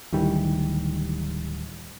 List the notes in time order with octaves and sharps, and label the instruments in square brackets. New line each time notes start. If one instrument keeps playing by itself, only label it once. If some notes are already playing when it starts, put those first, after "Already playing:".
[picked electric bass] D1 D#3 E3 G3